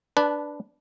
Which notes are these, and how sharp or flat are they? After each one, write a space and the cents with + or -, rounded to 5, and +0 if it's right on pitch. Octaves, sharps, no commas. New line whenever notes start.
D4 +0 B4 +0 A5 -20